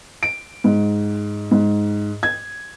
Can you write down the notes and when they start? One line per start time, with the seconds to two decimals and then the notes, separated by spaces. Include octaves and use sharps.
0.23 D7
0.64 G#2
1.51 G#2
2.23 G#6